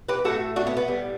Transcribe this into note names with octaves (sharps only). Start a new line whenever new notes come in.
G4 B4
A2 F#3 A3 F#4 A4
D4 F#4
B3
B3
A2 G3